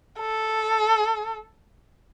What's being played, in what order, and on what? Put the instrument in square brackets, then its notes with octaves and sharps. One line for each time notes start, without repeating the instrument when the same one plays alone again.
[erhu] A4